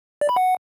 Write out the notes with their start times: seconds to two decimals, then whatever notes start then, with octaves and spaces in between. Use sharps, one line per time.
0.21 D5
0.29 B5
0.36 F#5